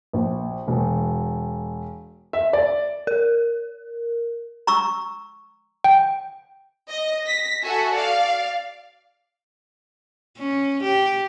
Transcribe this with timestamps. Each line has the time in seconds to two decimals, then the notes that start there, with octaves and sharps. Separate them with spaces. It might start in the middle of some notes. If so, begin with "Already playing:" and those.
0.13 A#1
0.68 E1
2.33 E5
2.53 D5
3.07 A#4
4.67 A#5 C#6 E6
5.84 G5
6.89 D#5
7.26 A#6 B6
7.63 F#4 A4 E5 G#5
7.95 D5 F5
10.38 C#4
10.83 G4